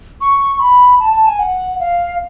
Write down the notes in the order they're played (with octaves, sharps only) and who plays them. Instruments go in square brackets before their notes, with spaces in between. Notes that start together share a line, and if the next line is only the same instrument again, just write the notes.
[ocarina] C#6
B5
A5
A5
G#5
F#5
F5